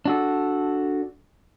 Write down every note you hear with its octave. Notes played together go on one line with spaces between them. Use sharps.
D4 F#4 A4